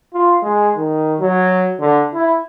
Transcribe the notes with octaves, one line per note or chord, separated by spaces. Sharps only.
F4
G#3
D#3
F#3
D3
E4